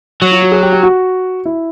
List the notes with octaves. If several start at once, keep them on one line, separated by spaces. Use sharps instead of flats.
F#3 F#4
F4
F#4
G#4
G4
G4
F#4
E4